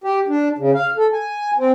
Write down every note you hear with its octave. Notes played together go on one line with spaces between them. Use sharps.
G4
D4
C#3
F5
A4
G#5
C4